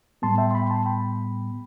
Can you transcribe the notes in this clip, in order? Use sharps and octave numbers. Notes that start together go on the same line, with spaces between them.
A2 G3 B3 A5 C6
E5 G5
C6
G5 B5
A5 C6
G5 B5